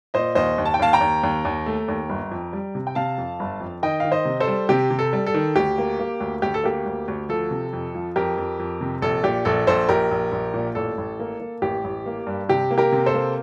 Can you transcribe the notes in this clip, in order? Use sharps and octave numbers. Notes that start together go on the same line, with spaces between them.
A#2 C5 D#5
D#2 C5 D#5
D#2
A5
G5
D#2 F5 A5
G5 A#5
D#2
D#2
D#2
A3
D#2
G1
F2
G3
C3
G5
C3 F5 A5
F2
G1
F2
D#3 D#5 G5
D#3 F5
C5 D#5
C3
A4 C5
G3
C3 G4
C3
A4
G3
A4
D#3
D2 G4
A#3
A#3
D2
D2 G4
A4
A#3 G4
D2
D2
F3 A4
C3
F2
F3
F2 G4 A#4
F2
F2
C3
A#1 A4
A#2 G4
A#1 A4
A#1 A4 C5
A#1 G4 A#4
A#1
A#1
A#2
A1 A4
A1
A#3
A#3
A1 G4
A1
A#3
G2
C3 G4
A#3
G4 A#4
C3
A4 C5
A#3